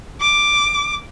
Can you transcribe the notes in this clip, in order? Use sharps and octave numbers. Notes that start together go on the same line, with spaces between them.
D6